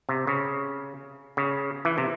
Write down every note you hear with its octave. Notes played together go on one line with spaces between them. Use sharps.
C3
C#3
C#3
E3
C3